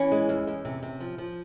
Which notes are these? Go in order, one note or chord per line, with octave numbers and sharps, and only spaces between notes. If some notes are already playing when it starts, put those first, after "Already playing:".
Already playing: E3 C#4
G#3
E2
E2
C3
C3
F3
F3